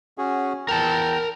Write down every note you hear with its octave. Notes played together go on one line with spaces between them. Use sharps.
C#4 F#4 G#4
E2 A#4 G5 A5